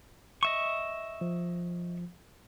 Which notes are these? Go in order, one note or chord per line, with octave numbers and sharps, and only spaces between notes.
D#5 E5 C#6
F3